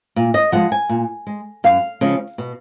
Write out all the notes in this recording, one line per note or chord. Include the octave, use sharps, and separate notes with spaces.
A#2
D#5
F3 G#3 F#5
G#5
A#2
G#3
F#2 F5
C#3 F3 G#3
B2